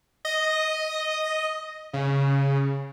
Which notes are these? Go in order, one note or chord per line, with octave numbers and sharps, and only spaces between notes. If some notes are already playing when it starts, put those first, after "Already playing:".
D#5
C#3